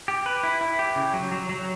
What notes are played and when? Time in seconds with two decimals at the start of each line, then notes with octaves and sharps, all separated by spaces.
0.08 G4
0.26 B4
0.43 E4
0.61 E4
0.79 G4
0.96 C#3
1.14 F#3
1.32 F#3
1.49 F#3